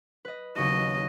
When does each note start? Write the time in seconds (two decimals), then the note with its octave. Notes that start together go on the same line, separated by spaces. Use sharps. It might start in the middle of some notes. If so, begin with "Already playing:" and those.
0.25 B4 D#5
0.57 D#2 C#3 F#3 D#5 C#6